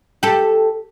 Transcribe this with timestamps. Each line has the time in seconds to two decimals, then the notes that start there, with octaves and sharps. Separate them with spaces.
0.23 G4 A4